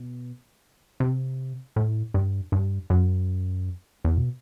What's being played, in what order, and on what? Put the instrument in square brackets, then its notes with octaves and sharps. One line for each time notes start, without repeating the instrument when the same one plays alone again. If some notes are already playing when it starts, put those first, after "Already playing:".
Already playing: [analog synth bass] B2
C3
A2
G2
G2
F#2
E2
B2